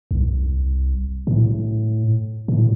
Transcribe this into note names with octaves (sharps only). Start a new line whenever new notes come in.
C2
A2
A2